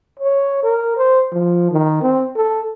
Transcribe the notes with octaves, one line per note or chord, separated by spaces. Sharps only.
C#5
A#4
C5
F3
D#3
C4
A4